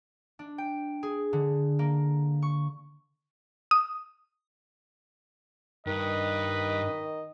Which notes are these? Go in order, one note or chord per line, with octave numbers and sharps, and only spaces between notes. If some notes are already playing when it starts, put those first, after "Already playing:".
D4
G5
G#4
D3
A#3
C#6
D#6
G2 D#3 B4 D#5